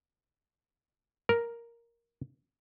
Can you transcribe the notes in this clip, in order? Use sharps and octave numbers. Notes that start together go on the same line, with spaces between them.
A#4